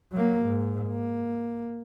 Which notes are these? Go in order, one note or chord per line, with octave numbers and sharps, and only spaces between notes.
F#3 A#3
G#2
A#3